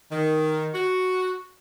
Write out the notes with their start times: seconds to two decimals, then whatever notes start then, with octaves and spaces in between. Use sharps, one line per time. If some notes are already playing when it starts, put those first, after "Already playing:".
0.12 D#3
0.74 F#4